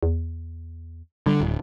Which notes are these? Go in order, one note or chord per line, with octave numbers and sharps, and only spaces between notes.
E2
D3 G3
D1